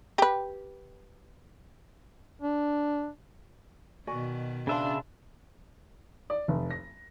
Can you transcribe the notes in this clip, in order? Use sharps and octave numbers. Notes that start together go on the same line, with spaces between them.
G4 B4
D4
B2 D#3 F#4 D5 G#5
C#3 D4 B4 D5 E5 F5 C6
D5
F1
A#6